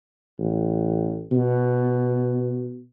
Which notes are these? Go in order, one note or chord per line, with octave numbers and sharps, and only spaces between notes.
A1
B2